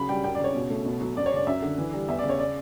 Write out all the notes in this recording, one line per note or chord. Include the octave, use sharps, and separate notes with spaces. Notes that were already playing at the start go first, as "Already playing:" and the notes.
Already playing: C#3 F#3 B5
G3 G5
F#2 G5
D5
C#3 C#5
B2
A3
B2
F#3
F#2 D5
C#5
C#3 D5
F#2 E5
D3
E3
G3
E2 E5
D5
C#3
C#5
D5